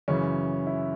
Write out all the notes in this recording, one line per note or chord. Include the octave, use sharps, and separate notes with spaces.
F#2 C#3 E3 C#4
E4